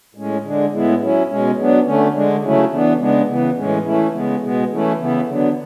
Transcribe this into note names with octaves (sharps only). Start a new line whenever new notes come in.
A2 G#3 C#4
D3 G#3 D4
A2 G#3 B3 E4
F#3 C#4 E4
B2 G#3 C#4
F#3 B3 D4
D3 A3 C#4
D3 G#3 D4
C#3 F#3 A3 C#4 E4
E3 B3 D4
C#3 G#3 B3 D4
C#3 E3 B3
A2 E3 G#3 C#4
E3 A3 C#4 E4
C#3 G#3 B3
B2 G#3 B3
E3 A3 C#4 E4
C#3 E3 B3 E4
D3 F#3 B3 D4